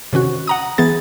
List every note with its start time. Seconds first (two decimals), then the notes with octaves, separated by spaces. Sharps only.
0.13 C3 D#3 C#4 F#4
0.48 F#5 A#5 D#6
0.78 E3 B3 G#4 A6